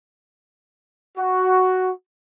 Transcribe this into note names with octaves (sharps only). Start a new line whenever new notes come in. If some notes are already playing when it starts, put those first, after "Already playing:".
F#4